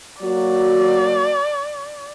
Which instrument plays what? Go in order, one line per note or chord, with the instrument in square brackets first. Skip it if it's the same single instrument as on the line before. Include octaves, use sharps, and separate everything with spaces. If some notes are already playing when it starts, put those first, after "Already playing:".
[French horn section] F#3 A#3 F#4 [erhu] D5